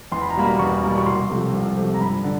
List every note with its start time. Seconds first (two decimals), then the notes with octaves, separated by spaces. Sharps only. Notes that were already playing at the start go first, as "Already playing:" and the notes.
0.12 E2 C6
0.21 B5
0.30 A#5
0.36 B2 G3 A#3 B5
0.59 E2 C#6
0.82 B2 G3 A#3
0.98 C#6
1.06 C2 C6
1.30 C3 F3 A3
1.53 C2
1.77 C3 F3 A3
1.94 A#5
2.01 G2 B5
2.24 D3